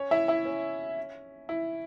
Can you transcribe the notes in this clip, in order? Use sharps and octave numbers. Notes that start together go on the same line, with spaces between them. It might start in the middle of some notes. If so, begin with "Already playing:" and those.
Already playing: C#4 C#5
E4 E5
E4 E5
C#4
E4